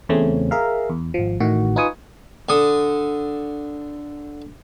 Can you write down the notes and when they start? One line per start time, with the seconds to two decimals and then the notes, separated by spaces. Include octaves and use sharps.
0.09 E2 C#3 A3 C4 C#4
0.51 G#4 A#4 E5 F5
0.90 E2
1.14 G#1 F3
1.40 A1 A2 D#3 F#4
1.76 D#4 F4 B4 G#5 C#6 D#6
2.49 D3 D#6